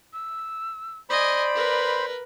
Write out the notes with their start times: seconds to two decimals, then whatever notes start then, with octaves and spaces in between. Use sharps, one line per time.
0.13 E6
1.10 C5 D5 D#5 G#5 B5
1.55 A#4 B4